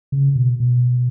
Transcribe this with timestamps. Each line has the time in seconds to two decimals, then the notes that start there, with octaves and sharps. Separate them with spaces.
0.12 C#3
0.35 B2
0.60 B2